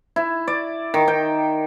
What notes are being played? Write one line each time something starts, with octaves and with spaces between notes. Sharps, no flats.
E4
D5
D#3
G5